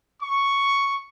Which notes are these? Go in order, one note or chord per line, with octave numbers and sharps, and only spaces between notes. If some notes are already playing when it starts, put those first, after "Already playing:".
C#6